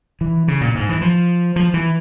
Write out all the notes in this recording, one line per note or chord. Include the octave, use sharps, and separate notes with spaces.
E3
C#3
A#2
G#2
E3
F3
F3
E3